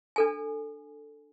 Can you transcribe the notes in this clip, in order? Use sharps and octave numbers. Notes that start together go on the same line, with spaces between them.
D4 A4 G#5